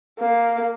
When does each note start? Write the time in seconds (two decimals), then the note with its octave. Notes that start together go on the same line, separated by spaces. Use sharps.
0.19 A#3